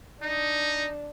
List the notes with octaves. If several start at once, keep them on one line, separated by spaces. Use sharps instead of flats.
D4 D#4